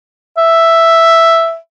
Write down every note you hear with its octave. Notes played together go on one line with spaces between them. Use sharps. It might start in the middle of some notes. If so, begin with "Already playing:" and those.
E5